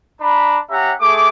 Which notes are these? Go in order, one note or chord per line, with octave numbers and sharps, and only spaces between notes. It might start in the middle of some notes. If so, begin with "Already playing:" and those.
D4 A#5 B5
C#4 G4 E5 F#5 A#5
A3 G#4 D6